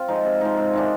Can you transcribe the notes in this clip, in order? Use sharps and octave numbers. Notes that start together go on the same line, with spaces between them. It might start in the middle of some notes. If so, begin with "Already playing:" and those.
Already playing: C4 F4
F3 G#3 D#4
C3
F3 G#3 D#4
C3
D#3 G#3 D4